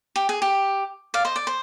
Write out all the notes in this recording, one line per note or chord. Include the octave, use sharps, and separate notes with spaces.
G4
G#4
G4
D5 F5
C5 D#5
D5
C5